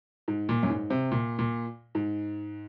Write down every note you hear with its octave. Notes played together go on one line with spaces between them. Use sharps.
G#2
A#2
F#2
G#2
C3
A#2
A#2
G#2